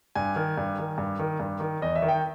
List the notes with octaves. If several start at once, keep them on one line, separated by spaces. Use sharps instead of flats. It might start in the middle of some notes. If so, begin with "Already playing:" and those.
G2 G#5
D#3
G2
D#3
G2
D#3
G2
D#3
E2 D#5
E5
D#3
G5